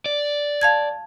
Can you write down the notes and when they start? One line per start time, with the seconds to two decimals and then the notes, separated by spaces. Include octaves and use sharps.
0.06 D5
0.61 F5 A5 G#6